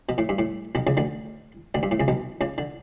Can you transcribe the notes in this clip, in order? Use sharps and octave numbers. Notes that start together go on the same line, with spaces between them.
B2
A2
G2
A2
B1 B2
C#2 C#3
D2 D3
D2 D3
G2
A2
C#2 C#3
B1 B2
C#2 C#3
D3